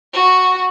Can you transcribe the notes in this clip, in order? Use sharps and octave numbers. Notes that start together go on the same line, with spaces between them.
F#4